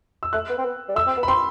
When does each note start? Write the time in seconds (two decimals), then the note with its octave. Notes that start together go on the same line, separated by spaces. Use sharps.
0.23 E6
0.33 A3 F#6
0.49 B3
0.59 C4
0.65 B3
0.89 G3
0.96 A3 E6
1.07 C4
1.17 B3
1.23 B5
1.28 C4 C6